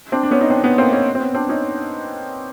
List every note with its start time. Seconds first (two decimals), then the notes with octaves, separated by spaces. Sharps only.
0.12 C4 D4
0.23 D4
0.31 B3 C#4
0.41 D#4
0.50 C4 D4
0.64 B3 C#4
0.78 A#3 C4
0.92 B3 C#4
1.15 C4
1.20 B3 C#4
1.34 C4 D4
1.49 C#4 D#4